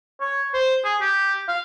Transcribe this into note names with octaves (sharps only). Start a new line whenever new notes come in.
C#5
C5
G#4
G4
F5